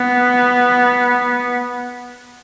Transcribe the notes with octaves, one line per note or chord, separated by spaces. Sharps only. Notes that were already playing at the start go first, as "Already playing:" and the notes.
Already playing: B3